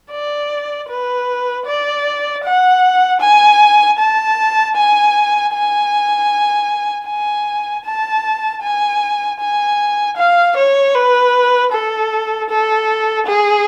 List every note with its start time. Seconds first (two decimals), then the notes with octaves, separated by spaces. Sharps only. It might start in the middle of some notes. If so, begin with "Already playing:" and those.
0.11 D5
0.89 B4
1.66 D5
2.43 F#5
3.21 G#5
3.98 A5
4.76 G#5
5.54 G#5
7.07 G#5
7.85 A5
8.62 G#5
9.40 G#5
10.17 F5
10.57 C#5
10.95 B4
11.72 A4
12.50 A4
13.27 G#4